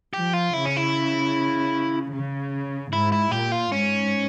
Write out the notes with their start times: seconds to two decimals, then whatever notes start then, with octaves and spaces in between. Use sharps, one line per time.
0.14 F3 G4
0.33 F4
0.54 C#3 E4
0.65 C#4
0.77 E4
2.13 C#3
2.93 G#2 E4
3.12 E4
3.31 A#2 G4
3.52 F4
3.72 G#2 C#4